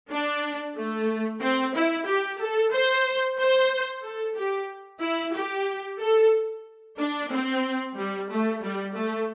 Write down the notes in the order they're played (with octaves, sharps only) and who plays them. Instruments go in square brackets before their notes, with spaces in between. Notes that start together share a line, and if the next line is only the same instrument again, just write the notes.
[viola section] D4
A3
C4
E4
G4
A4
C5
C5
A4
G4
E4
G4
A4
D4
C4
G3
A3
G3
A3